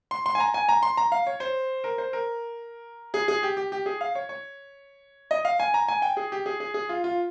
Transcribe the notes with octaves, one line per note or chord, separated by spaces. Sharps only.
C6
C6
G#5
A#5
G#5
A#5
C6
A#5
F5
C#5
C5
A#4
C5
A#4
G#4
G#4
G4
G4
G4
G#4
F5
C#5
C#5
D#5
F5
G#5
A#5
G#5
G5
G#4
G4
G#4
G#4
G#4
F4
F4